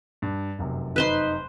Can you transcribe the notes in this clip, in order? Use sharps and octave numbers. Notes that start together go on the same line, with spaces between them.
G2
F1 F#2 C3
D#4 B4 C5 C6